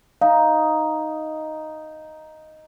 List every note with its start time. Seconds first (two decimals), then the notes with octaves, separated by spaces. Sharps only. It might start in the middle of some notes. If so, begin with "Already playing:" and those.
0.21 D#4 F5